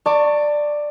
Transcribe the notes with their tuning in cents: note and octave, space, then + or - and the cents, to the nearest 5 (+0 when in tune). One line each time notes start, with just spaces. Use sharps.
D5 +10 A5 +35 C#6 +0